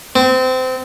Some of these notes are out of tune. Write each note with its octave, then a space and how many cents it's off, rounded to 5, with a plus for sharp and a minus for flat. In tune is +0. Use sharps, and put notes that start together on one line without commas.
C4 -25